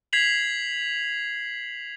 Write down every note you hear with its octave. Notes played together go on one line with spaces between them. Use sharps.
G#6 B6 C7 F7 F#7